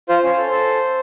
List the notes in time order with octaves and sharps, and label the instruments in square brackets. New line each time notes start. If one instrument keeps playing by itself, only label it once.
[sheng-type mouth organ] F4 C5
C#4
A4
A4